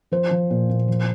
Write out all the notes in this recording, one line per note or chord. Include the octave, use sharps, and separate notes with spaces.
F3 C5
F3
A#2
A#2
F3